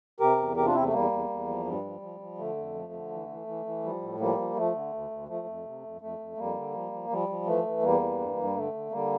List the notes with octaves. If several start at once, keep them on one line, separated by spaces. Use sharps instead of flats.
C3 G4 A#4
E2
C3 G4 A#4
D4 F4
E2 C4 E4
A3
E2 G3 A#3
E2
E2
F3
G2 G3
F3
F3
F3
D3 A3
F2
F3
D3
E3
E3
E3
E3
F3 G3
A2
F3 G3 A#3
F3
F3 A3
D3
D2
D2
F3 A3
F2
C3
F2
F2 A3
F2
F2 G3 A#3
D3
F3
F3
F3 G3
F3
E3 A3
E3
E2 G3 A#3
E3
G2
G2
G3
D3 A3
D3
D3 G3 A#3